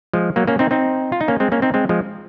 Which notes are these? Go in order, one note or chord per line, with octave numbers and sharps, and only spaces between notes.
F3 G#3
F#3 A#3
A#3 C#4
C4 D#4
C4 D#4
F4
D#4
A#3 C#4
G#3 C4
A#3 C#4
C4 D#4
G#3 C4
F3 G#3